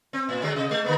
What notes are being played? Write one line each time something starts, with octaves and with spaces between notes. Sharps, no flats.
C4
A2
D3 F#3 G#3
C3 D#5
G#3
D3 A#3 B3